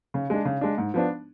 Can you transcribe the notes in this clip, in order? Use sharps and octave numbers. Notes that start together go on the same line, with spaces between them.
C#3
G#3 D4
C#3
G#3 D4
G#2
F3 B3 D4